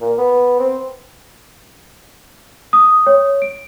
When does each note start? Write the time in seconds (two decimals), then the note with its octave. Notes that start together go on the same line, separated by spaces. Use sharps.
0.01 A#2
0.18 B3
0.59 C4
2.73 D#6
3.07 C#5
3.42 D7